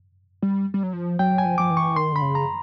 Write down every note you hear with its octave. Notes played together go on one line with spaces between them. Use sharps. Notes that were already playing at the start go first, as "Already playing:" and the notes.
G3
G3
F#3
F3
F#3 G5
G#5
F3
F3 D6
E3
C#6
D#3 C6
D3 B5
C#3
A#5